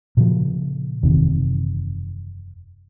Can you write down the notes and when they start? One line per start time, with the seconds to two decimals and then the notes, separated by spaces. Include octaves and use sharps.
0.17 A#2 C#3 F3
1.03 F#1 E2 C3 D#3